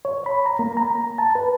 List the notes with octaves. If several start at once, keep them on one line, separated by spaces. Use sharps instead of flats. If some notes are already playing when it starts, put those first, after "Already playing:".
C#5
B5
A#5
A#3
A#5
A5
B4